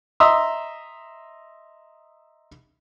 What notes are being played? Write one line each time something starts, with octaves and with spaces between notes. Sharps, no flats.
D#5 E5 A#5 C6 D#6 E6